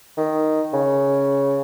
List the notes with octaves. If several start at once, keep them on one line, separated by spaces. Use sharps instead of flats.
D#3
C#3